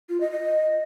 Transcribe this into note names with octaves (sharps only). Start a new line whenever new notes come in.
F4
D#5
D#5